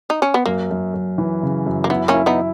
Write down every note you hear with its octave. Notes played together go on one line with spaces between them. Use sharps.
D#4
C#4
B3
F#2 A#3
F#2
F#2
E3
C#3
F#2
A#3
B3 E4
A#3 C#4
E4
B3 D#4